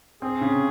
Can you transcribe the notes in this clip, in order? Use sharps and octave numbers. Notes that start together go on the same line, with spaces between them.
C4 G#4
C#3